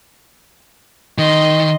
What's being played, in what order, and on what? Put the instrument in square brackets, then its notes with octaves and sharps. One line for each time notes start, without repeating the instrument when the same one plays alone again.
[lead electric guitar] D#3 [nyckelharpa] D#5 C6